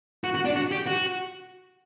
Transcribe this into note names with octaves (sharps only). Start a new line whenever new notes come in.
F#4
F#4
D4
F#4
G4
F#4